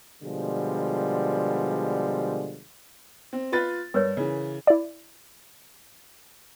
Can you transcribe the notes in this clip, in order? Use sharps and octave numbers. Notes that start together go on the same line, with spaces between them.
B2 D3 F3 G3 G#3
C4
F4 B4 A6
G2 A#4 B4 C#5
C#3 E3
E4 D5